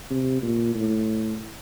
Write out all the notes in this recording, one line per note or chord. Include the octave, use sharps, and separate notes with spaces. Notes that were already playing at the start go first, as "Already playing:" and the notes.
C3
A#2
A2